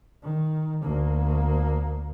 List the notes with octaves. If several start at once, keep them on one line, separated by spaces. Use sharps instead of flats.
D#3
D2 A#3